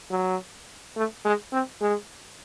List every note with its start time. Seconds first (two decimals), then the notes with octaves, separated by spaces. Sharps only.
0.11 F#3
0.96 A3
1.25 G#3
1.53 C4
1.82 G#3